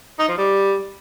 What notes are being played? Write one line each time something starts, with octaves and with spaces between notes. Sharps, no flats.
D#4
F3
G3